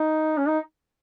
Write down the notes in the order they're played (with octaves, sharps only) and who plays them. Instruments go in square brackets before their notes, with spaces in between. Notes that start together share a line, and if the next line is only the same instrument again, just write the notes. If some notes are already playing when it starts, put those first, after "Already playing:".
Already playing: [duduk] D#4
C#4
D#4